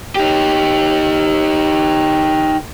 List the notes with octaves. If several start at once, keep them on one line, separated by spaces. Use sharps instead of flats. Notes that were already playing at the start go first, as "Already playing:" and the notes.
D#4 G4